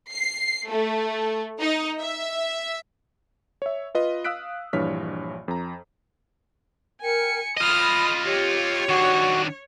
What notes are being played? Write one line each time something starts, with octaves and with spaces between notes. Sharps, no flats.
C7
A3
D#4
E5
C#5 E5
F4 B4 D#5
F5 D#6 E6 F#6 B6 D7
A#1 G2 E3 C#5 F6 B6
F2 A#5
A#4 G5 G#5 C#7
F4 D#5 B5 D#6 F6
G4 C#5
D#3 D4 F#4